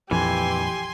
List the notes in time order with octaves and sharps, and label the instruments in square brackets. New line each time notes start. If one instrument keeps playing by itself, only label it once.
[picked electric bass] A#1 F2 [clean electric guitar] E3 [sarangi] G4 [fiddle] G#5 C6